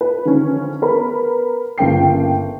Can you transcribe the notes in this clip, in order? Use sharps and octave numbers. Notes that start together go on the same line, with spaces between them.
B4
D3 D#3 F3 C#4
B3 A#4 B4 B5
G1 C#3 A#3 G5 C7